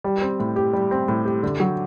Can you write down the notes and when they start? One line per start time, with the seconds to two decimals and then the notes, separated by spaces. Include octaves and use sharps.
0.04 G3
0.21 C4
0.40 A2
0.56 G4
0.73 G3
0.91 C4
1.08 A2
1.25 G4
1.43 D3
1.60 F#3